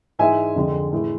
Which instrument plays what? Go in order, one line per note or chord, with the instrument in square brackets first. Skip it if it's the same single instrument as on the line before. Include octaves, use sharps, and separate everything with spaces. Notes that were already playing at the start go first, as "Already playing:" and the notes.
[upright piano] G#2 E3 G#3 E5 G#5
F2 D3 G#3
A2 E3 G#3